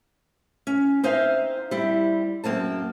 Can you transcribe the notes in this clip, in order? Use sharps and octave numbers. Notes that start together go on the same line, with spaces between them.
C#4
C4 D#4 C5 E5 F5
G3 C4 E4
F#2 A#3 C4 A5